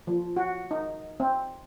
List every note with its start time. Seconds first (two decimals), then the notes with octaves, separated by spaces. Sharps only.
0.07 F3
0.37 F#4
0.71 D#4
1.20 C4